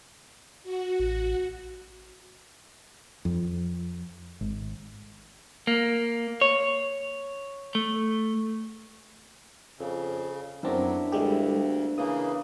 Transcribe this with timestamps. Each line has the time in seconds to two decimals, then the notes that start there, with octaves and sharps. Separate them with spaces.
0.63 F#4
1.00 A1
3.25 F2
4.41 G#1
5.67 A#3
6.41 C#5
7.75 A3
9.79 F2 C#3
10.63 F#2 F#3 B3 C4 D4 E4 A#4
11.12 D2 G3 G#3 G4 A4 F5
11.98 C#3 E3 A#3 D#6